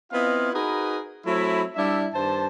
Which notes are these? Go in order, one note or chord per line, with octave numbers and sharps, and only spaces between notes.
B3 C4 E4 F4 D#5 F5
D#4 F#4 G#4 A#4 B4
F#3 A3 C4 E4
G3 D4 E4 D5 E5
G2 D#3 C5 A5